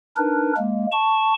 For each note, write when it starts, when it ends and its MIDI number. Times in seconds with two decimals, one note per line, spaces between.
0.17 0.53 62
0.17 0.53 63
0.17 0.53 70
0.17 0.53 71
0.57 0.86 56
0.57 0.86 58
0.92 1.34 81
0.92 1.34 85